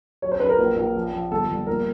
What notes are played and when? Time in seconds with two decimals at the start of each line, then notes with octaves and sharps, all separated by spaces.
0.22 F#3 C#5
0.32 C5
0.40 F#3 B4
0.49 A#4
0.59 A#1
0.76 A#1
0.95 F3
1.13 F3
1.31 G1 A4
1.50 G1
1.67 A#1 A#4